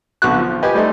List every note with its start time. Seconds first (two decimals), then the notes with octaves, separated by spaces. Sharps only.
0.22 B1 D3 B3 F#4 C#6 F#6
0.38 F3
0.63 G4 B4 D#5 G#5
0.74 G3 A3 D#4 C5